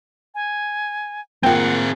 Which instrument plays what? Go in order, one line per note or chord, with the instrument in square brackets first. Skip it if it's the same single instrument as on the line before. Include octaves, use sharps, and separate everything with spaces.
[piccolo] G#5
[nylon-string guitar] A#3 F4 [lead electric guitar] C4 G#4 [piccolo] F#5 [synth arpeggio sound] G5